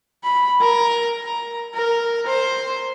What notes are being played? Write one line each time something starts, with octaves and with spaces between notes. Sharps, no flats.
B5
A#4
A#5
A#4
C5